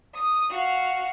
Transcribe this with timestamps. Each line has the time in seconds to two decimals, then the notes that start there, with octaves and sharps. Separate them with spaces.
0.15 D#6
0.50 F#4 F5